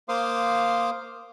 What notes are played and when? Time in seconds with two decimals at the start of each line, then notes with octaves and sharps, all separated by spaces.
0.09 A#3 C5 F5 C6 D6 D#6